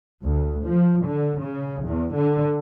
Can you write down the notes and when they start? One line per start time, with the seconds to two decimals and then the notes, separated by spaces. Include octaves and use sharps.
0.23 D2
0.65 F3
1.05 D3
1.39 C#3
1.85 E2
2.15 D3